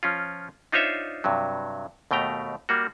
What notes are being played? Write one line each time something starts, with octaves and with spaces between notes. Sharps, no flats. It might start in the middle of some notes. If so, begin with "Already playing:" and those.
F3 C#4 F4
D4 D#4 F4 C5 C#5 E5
G2 C3 F#3
D#2 B2 A3 G5 A#5
G3 A#3 F#4